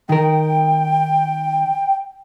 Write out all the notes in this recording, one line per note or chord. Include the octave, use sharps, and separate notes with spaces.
D#3 A#4 G5